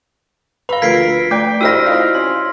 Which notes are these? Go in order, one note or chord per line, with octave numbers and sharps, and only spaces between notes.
B4 F5 B5
D2 F3 A3 A#4 G#6 B6 C7 D7
A3 D5 G5
E4 F#4 C5 D5 E6 F6 A#6
C4 D#4 F4
C#4 C6